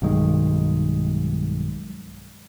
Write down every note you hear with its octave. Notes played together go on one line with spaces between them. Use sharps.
B1 G2 D#3 G#3